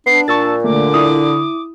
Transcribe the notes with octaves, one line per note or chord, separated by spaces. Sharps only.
B3 D4 C7
A#2 A5 C#6 E6 A6
D3 A3 A#3 D6
E4 D#6